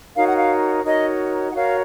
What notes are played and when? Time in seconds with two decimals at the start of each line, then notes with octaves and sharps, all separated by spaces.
0.16 D#4 F#4 A#4 C#5 F5
0.26 F#5
0.36 F5
0.84 D#4 F#4 A#4 C#5 D#5
1.50 F#5
1.53 F#4 A#4 C#5 F5